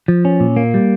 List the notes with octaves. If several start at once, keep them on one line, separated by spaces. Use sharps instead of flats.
F3
C#4
A#2
A#3
G3